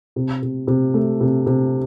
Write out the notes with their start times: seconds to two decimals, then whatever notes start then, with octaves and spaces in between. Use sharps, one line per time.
0.16 C3
0.42 C3
0.67 C3
0.94 A3
1.21 C3
1.46 C3